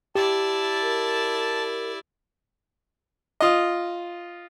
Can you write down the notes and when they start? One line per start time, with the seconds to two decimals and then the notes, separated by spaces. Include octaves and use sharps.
0.15 E4 G4 D5 A5
0.82 A#4
3.40 F4 D#5